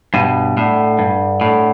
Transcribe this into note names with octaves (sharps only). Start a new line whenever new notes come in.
G2 B2 D4
A2 A4 D5 F#5
G2 D4
A2 A4 D5 F#5